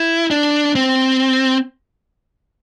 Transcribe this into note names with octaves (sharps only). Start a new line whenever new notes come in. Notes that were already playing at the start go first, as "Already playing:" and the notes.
Already playing: E4
D4
C4